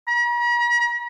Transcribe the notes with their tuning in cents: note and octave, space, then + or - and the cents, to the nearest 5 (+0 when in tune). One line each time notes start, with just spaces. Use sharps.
A#5 +45